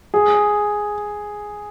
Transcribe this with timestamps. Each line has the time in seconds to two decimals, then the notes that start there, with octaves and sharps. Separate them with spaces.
0.14 G#4